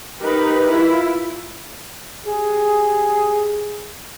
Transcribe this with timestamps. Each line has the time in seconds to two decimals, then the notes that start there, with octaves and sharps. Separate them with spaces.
0.21 D#4 G4 A#4 B4
0.68 E4 F4
2.26 G4 G#4